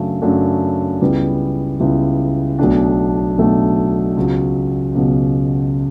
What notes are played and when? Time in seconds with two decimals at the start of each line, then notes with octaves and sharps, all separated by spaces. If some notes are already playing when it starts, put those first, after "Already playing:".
Already playing: F#2 C#3 F#3 A3 D4
0.22 F#2 C#3 F#3 A3 D4
1.01 C#2 C#3 G3 B3 E4
1.80 C#2 C#3 G3 B3 E4
2.59 B1 B2 A3 D4
3.38 B1 B2 A3 D4
4.16 C#2 B2 F#3
4.95 C#2 B2 F#3